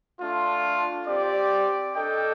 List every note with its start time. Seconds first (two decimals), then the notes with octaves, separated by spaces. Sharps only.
0.19 A3 D4 F4
1.06 C4 G4 D5
1.94 D4 A4 D#5 G5